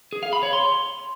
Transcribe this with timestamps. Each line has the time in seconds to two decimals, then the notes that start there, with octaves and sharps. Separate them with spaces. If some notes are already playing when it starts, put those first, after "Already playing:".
0.13 G#4
0.23 F5
0.33 B5
0.43 C#5
0.53 C6